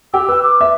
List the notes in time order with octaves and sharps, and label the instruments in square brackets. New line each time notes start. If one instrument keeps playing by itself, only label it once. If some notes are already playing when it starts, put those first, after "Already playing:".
[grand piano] G4 [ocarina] E6
[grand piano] B4 [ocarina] E6
[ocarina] D6
[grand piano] E5